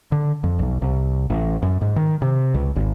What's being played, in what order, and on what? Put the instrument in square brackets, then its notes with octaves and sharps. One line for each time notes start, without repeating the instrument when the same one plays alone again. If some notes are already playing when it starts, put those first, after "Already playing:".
[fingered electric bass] D3
F2
B1
C2
A1
F#2
G#2
D#3
C3
C#2
G#1